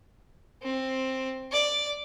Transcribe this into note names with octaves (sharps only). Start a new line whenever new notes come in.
C4
D5